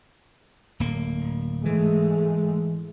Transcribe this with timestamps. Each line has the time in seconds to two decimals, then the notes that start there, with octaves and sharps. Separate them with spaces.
0.80 D1 A#3
1.65 G#2 E3 G#3 A3